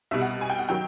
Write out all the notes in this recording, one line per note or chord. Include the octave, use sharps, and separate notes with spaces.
C2 B2 G3 E5
F#5
G#5
G5
F#5
D#3 F#3 G5